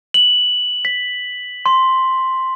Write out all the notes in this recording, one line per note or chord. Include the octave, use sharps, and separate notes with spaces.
F#7
B6
C6